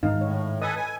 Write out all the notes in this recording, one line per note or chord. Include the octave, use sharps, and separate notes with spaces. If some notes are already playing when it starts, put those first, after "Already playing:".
G#2 D#3 G#3 D#4 F5
A2 C#5
A4 B4 D#5 G#5 D#6
G#5